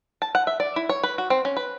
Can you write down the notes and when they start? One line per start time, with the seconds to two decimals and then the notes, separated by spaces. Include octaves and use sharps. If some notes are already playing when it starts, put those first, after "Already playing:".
0.22 A5
0.35 F#5
0.47 E5
0.60 D5
0.76 E4
0.89 C#5
1.03 B4
1.18 F#4
1.30 C4
1.45 C#4
1.57 B4